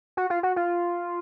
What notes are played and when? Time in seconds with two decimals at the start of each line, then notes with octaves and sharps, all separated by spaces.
0.17 F#4
0.30 F4
0.43 F#4
0.56 F4